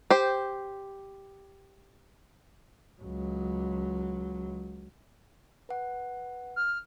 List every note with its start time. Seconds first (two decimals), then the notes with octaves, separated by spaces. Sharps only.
0.11 G4 C5
3.01 C#2 F#3
5.69 B4 F#5
6.56 F6